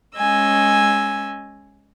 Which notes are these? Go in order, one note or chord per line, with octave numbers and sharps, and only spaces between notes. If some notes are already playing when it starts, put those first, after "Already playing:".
G#3 C#4 D#5 G#5 E6